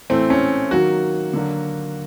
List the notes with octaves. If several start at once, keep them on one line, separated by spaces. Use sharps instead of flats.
A2 E3 A3 C4
C#4
D#3 F#3 A#3 F#4
D3 F#3 A#3